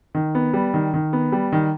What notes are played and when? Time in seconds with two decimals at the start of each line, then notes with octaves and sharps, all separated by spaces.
0.15 D#3
0.35 B3
0.53 G3
0.74 D#3
0.94 D#3
1.13 B3
1.32 G3
1.52 D#3